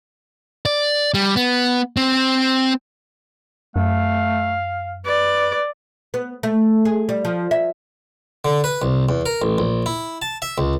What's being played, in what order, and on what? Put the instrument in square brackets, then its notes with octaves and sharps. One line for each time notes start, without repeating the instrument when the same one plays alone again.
[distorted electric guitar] D5
G3
B3
C4
[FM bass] F#2 [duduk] A3 [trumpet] F5
[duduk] B4 [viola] D5
[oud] B3
A3
G#4
G3
F3
E5
[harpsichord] D3
B4
C2
E2
A#4
A1
A#1
E4
A5
E5
C#2